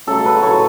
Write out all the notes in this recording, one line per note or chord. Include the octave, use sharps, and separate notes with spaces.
C#3 F#3 A3 A4
B4
A2 F#3 A3 C#5